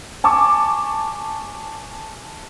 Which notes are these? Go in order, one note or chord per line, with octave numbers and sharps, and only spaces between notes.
G#5 A5 C#6 D6